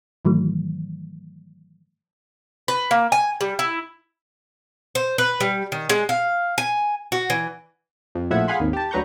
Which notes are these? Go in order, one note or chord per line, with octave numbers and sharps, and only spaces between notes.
G#2 D#3 E3 F#3 A3
B4
A#3
G#5
G3
E4
C5
B4
G3
D#3
G#3
F5
G#5
F#4
E3
F2
A#1 A2 F3 E5 F#5 G#6
G#4 F5 F#5 G#5 B5 C6
G#1 D#2
G4 A5
D2 F#3 B4 A#5 C#6 G6